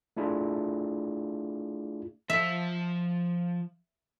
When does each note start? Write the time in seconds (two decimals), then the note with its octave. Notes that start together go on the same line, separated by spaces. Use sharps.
0.17 A3 D4 E4 F4 G#4 D5
2.30 F3 E5 A5